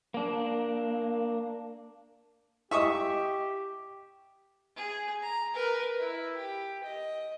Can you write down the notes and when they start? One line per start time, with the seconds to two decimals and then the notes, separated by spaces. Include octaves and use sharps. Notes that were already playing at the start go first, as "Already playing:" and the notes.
0.14 A#3 D4
2.71 E4 G4 D#5 E5 C#6 D#6
4.75 G#4
5.22 A#5
5.54 A#4 B4
5.99 E4
6.37 G4
6.83 D#5